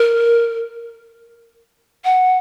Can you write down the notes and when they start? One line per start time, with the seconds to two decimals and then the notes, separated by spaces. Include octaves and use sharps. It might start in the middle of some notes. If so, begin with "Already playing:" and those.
Already playing: A#4
2.04 F#5